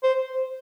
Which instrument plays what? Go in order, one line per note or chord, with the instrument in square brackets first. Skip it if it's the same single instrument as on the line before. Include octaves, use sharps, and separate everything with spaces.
[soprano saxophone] C5